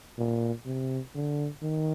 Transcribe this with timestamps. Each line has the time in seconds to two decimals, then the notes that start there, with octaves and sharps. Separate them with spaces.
0.18 A#2
0.66 C3
1.15 D3
1.62 D#3